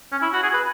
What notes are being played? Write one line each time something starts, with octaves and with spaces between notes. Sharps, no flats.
C#4
E4
F#4
G#4
B4